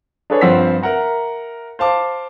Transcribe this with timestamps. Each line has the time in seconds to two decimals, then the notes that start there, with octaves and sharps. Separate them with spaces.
0.30 D4 G#4 A4 B4 C#5
0.41 G2 F3 C4 F#5 E6 B6
0.83 A#4 E5 F#5 A#5
1.79 C5 F5 A5 D6